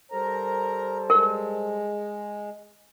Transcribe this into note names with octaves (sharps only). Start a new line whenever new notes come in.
G3 A4 A#4 C5 A#5
G#3 A#4